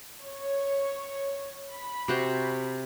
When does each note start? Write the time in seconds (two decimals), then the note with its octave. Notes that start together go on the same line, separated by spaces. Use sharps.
0.23 C#5
1.72 B5
2.08 C3 F#4 C5